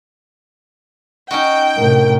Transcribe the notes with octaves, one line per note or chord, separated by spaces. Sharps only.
C#4 D#4 F#4 G5
A2 C3 A#4